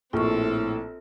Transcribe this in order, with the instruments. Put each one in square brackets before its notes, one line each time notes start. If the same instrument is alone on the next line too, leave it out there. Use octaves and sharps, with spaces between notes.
[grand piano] A#1 [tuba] A2 [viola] C4 A4 [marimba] F4 C#6